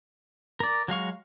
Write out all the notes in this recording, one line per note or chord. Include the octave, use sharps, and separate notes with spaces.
A#4 D5
F#3 G#3 F5 C#6